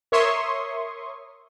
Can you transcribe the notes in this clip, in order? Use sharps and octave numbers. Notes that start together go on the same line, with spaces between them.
A#4 C#5 E5 C6 C#6 D#6